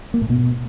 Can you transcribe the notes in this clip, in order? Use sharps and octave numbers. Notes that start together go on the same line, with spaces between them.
A#3
A2
B2